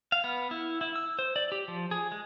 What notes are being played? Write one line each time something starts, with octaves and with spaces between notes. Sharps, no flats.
F5
B3
E4
E4
E6
C5
D5
G4
F3
G#4
G#3